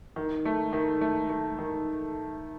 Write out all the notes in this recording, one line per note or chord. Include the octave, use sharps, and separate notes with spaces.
D#3
A3
D#3
A3
A3
D#3